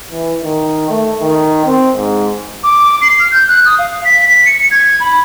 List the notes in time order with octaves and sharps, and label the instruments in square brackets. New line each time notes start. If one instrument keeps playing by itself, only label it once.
[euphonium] E3
D#3
A3
D#3
C4
G#2
[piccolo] D6
C7
F6
G6
F#6
D#6
F5
B6
B6
C#7
G#6
B5